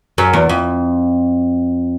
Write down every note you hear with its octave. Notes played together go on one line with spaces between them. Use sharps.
F#2
E2
F2